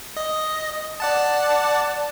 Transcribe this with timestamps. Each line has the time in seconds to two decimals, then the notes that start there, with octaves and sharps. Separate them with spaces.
0.17 D#5
1.00 D5 F#5 A5